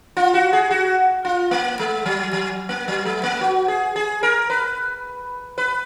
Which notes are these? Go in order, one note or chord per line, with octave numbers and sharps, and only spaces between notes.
F4
F#4
G#4
F#4
F4
A#3
G#3
F#3
F#3
A#3
F#3
G#3
A#3
F#4
G#4
G#4
A#4
B4
B4